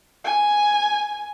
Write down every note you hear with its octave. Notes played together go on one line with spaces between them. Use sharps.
G#5